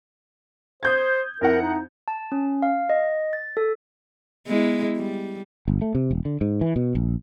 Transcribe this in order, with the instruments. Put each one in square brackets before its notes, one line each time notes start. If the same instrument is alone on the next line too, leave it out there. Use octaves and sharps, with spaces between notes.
[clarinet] C5 [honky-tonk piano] D#6 G6 G#6
[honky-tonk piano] F2 E4 F#5 [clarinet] A#4
[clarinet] D#4
[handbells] A5
C#4
F5
D#5
A6
A4
[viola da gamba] G#3 B3 E4
G3
[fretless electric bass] G1
A3
C3
E1
D3
G#2
E3
B2
A#1